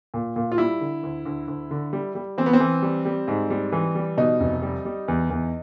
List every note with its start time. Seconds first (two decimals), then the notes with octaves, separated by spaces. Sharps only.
0.14 A#2
0.36 A#2
0.52 F4
0.58 G3 E4
0.81 D3
1.03 D2
1.26 D2
1.48 D2
1.71 D3
1.93 G3
2.15 G3
2.38 E3 C4
2.46 B3
2.53 C4
2.60 E3
2.82 G3
3.05 G3
3.28 G#2
3.50 G3
3.72 E3
3.95 G3
4.17 B2 D#4
4.40 F1
4.62 G3
4.85 G3
5.08 E2
5.30 E2